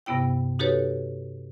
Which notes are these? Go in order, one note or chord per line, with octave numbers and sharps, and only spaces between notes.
G2 C3 B3 E4 G5
D#4 F#4 G4 A4 B4 C#5